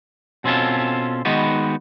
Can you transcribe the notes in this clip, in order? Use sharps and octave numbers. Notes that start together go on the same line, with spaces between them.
B2 C4 C#4 F4 A4
D#3 G#3 B3 D#4 F#4 B4